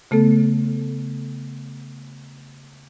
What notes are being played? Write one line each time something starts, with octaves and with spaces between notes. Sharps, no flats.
C#3 A3 B3 A4